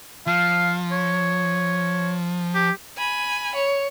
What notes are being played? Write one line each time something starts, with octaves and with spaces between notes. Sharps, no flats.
F3 F5
C#5
G4
G#5 B5
C#5